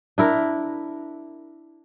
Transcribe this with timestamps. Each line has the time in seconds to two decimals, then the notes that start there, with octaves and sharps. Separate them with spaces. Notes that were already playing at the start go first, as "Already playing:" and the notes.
0.18 D4 E4 A#4